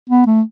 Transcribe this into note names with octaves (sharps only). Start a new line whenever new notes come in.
B3
A3